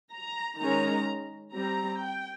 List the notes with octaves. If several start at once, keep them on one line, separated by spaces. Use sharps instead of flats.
A#5
D#3 G#3 C#4 A#5
G3 C4 A#5
G5